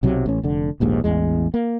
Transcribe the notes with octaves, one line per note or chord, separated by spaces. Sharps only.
B1 C3 F#3
A1 C#4
F1 D3
D#1 A#1 D#2 G#2
A1 E2 G#3
A#3